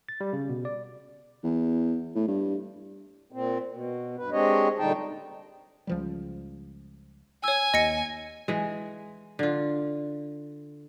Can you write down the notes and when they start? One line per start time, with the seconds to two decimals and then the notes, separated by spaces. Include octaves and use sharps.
0.09 A6
0.21 G3
0.33 C#3
0.49 B2
0.65 D5
1.44 E2
2.15 A2
2.28 G2
3.32 A#2 C4
3.71 B2
4.17 G2 B4
4.32 G#3 C4 D4 G4 C#5 D#5
4.79 A#2 D3 G3 D#4 G5 A5
5.87 C#2 F3 G3
7.44 C#5 G#5 E6
7.74 D#2 D#5 A#6 C#7
8.48 E3 G#3
9.39 D3 F4